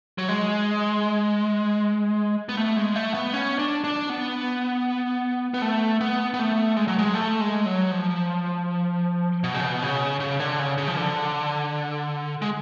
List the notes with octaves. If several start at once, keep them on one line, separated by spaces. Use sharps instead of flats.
F#3
G#3
B3
A3
G#3
A3
B3
C#4
D4
D4
B3
B3
A3
B3
B3
A3
G#3
F#3
G#3
A3
G#3
F#3
F3
B2
C#3
B2
C#3
C#3
D3
C#3
C#3
F3
D3
G#3